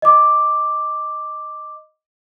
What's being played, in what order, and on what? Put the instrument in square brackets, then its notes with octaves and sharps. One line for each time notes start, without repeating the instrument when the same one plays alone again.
[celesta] D#5 D6